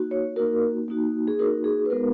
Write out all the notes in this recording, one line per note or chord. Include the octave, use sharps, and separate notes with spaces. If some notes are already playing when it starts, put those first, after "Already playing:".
Already playing: A#3 D#4 F#4
C#5
A#3 D#4 F#4 A#4
A#3 D#4 F#4
G#4
A#3 D#4 F#4 A#4
G#4
B4
G#3 B3 D#4 F#4 A#4